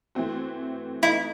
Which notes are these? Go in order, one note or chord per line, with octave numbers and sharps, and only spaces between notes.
E3 A3 C4 F#4
E3 A3 D#4 E4